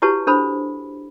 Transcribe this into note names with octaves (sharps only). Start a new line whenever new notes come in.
E4 F#4 G4 B4 C#5 A5
D4 A4 C5 B5